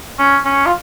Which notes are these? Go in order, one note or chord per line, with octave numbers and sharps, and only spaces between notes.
C#4
C#4
F4